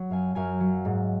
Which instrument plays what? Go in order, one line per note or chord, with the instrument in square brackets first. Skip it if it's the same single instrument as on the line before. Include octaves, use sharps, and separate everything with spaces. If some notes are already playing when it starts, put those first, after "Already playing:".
Already playing: [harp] F#3
F#2 F5 G#5
F#2 F5 G#5
F#3
G#2